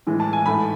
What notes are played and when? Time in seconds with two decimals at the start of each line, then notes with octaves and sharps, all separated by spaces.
0.07 A2 E3 G#3
0.20 A5
0.33 G#5
0.46 G#2 E3 A3 B5